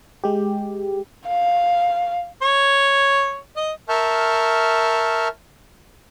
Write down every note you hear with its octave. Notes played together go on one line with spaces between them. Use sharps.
G#3 G4
F5
C#5
D#5
A#4 E5 A5 C#6 F6 G6